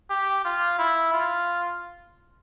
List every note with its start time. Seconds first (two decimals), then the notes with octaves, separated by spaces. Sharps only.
0.10 G4
0.44 F4
0.79 E4
1.13 F4